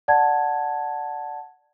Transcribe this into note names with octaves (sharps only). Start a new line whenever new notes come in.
D5 F#5 A5 G#6